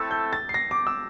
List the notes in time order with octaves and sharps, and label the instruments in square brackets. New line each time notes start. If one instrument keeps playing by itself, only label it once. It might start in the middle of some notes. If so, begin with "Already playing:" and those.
Already playing: [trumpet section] A3 C4 E4 A4 [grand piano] E6
[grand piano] G6
A6
C7
A#6
D6
E6